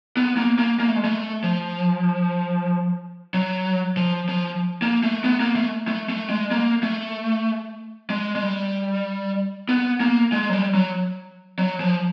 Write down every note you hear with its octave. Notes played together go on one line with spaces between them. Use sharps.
B3
A#3
A#3
A#3
A3
G#3
A3
F3
F#3
F3
F3
A#3
A3
B3
A#3
A3
A3
A3
G#3
A#3
A3
G#3
G#3
G3
B3
A#3
G#3
F#3
G3
F#3
F#3
F3